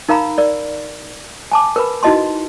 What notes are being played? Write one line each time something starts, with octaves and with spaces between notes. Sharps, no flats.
D#4 A#4 F5 A#5 B5
A#4 D5
G#5 A5 D6
A#4 B4 B5
D#4 E4 F#4 D#5 A5 C6